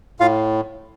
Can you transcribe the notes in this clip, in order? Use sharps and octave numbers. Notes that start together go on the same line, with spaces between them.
A2 F4 F5